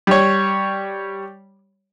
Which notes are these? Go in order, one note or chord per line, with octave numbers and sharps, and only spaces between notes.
G3 C#5